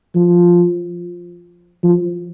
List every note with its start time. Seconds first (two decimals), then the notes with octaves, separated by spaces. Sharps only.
0.15 F3
1.83 F3